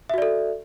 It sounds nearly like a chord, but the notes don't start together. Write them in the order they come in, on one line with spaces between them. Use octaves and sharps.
E5 F#4 D5 A4